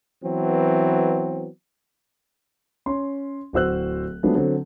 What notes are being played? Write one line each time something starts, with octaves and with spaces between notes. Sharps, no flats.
E3 F#3 B3 C4
C#4 C6
D1 F#4 C5 E6 F#6
F3 F#3 G#3 A3 B3 D4
D3 F#3 C4